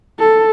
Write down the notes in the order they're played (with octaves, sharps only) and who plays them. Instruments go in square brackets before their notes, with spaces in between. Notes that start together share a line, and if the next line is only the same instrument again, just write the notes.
[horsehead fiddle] A4